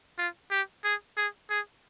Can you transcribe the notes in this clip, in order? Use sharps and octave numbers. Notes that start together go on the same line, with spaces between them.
F4
G4
G#4
G#4
G#4